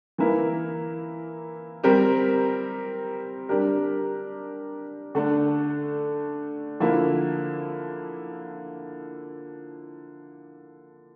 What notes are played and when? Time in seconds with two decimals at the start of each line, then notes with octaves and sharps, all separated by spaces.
0.18 E3 A#3 E4 A#4
1.83 G3 C4 G4 A#4
3.49 G3 D4 G4 A#4
5.15 D3 A3 D4 A4
6.80 D3 F3 A#3 E4